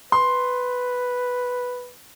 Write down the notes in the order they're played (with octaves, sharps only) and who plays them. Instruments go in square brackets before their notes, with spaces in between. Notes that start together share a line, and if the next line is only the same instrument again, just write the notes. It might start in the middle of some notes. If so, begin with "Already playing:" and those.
[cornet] B4 [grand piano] C6